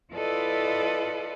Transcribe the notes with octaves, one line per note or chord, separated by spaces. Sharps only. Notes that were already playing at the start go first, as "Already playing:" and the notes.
E4 F4 A4 B4 D5 D#5